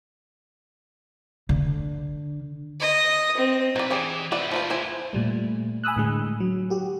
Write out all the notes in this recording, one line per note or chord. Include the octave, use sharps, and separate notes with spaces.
D3
D#5
C4
B1 D#3 B4 D5
E3 G4 G#4 D5
G#3 B3 B4 D5 E5
F3 F4 C5
E4 C5 G#5
A#2 G3 A3
G#5 B5 D#6 E6 F#6
A2 D3 G#3
F#3
F#4 G4